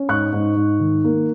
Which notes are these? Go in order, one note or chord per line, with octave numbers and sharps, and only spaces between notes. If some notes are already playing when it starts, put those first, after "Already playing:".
Already playing: C#4
G#2 C#6 F#6
G#2
G#2
D#3
A#3